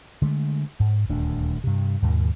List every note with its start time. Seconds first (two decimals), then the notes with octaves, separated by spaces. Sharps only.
0.22 D3 G#3 A3
0.80 G#2
1.09 D#1 D2 A3 D4
1.64 G2 C3
2.02 D#2 G#2 B2 D#3